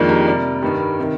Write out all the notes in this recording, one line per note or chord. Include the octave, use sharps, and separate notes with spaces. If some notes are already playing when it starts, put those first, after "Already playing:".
Already playing: F2 D#3 G#3 A#3 D4
G4 A#4
C3 G3 A#4 D5
G2 D#3 G3
C3 D#3